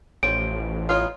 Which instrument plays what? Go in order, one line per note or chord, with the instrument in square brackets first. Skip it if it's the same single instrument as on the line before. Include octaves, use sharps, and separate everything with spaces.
[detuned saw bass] A1 [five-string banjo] F3 C5 C#5 [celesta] D7
[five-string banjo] B3 D#4 C#5 [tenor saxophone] F4